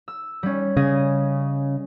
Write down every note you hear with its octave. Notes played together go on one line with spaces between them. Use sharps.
E6
G3 C#4
C#3 D#5 G#5